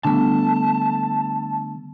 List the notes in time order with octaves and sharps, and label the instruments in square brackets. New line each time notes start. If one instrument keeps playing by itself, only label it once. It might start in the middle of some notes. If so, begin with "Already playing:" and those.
[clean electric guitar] D3 A3 [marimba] G3 B3 D4 [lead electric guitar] A5